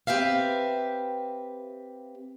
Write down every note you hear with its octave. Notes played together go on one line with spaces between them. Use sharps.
C4 G4 B4 E5 F5